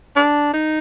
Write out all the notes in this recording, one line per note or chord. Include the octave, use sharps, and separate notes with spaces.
D4
D#4